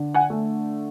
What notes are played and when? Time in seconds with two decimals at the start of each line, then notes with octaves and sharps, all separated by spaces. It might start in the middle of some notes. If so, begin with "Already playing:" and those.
Already playing: D3
0.14 F#5 G#5
0.30 A3